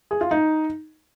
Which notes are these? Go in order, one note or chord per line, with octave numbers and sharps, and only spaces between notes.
G#4
F4
D#4